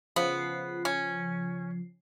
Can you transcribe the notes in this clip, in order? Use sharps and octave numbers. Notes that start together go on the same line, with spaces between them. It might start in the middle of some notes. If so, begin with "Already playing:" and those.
C#3 F3 B3 C7
C#4